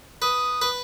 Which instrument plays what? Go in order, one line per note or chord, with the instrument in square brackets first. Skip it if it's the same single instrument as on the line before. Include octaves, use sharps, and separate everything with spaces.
[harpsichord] B4 [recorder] D#6
[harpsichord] B4